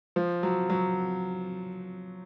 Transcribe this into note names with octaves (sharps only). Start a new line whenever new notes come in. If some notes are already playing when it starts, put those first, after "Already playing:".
F3
F#3
F#3